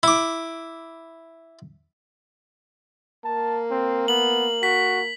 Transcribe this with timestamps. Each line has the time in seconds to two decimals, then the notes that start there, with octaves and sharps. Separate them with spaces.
0.03 E4 D6
3.24 A#3 A5
3.71 C4
4.08 B3 F#7
4.63 F#4 B6